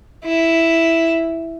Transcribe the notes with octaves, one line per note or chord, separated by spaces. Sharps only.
E4